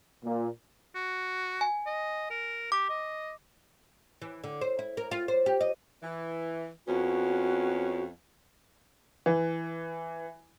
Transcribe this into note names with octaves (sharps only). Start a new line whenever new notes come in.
A#2
F#4
G#5
D#5
A#4
G4 D6
D#5
E3
D3
C5
E4
A#4
F4
C5
G4
D#5
E3
F2 B3 C#4 F#4
E3